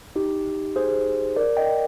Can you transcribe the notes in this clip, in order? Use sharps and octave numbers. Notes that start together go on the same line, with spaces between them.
D#4 G4
G#4 C5
A#4 D5
D#5 G5